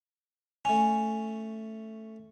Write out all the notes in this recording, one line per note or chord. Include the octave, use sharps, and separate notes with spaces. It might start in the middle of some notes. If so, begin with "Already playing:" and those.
A3 C#4 G#5